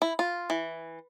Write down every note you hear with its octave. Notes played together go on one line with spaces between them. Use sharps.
E4
F4
E3